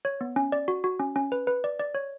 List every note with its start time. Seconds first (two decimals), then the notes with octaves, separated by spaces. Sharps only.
0.05 C#5
0.21 B3
0.36 C#4
0.52 D5
0.68 F#4
0.84 F#4
1.00 C#4
1.16 C#4
1.32 B4
1.47 B4
1.64 D5
1.79 D5
1.95 C#5